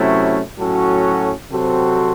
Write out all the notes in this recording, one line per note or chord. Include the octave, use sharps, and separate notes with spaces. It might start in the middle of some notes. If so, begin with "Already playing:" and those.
Already playing: C3 F#3 A3 C#4 E4
A2 F#3 C#4 F#4 A4
C3 F#3 C4 F#4 A4